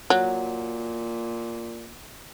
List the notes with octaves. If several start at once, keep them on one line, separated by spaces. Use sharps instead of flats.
A#2 F#3